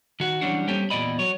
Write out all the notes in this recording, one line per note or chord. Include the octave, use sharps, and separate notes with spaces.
D#3 F#4
E3 F#3 G3 C#4 D4 F#4
G3 A#3 C4 C#4 G4 A4
E2 A#2 E3 D5 D#5 B5
F#3 C#5